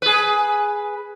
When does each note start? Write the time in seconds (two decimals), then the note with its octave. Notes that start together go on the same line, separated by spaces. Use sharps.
0.02 G#4 B4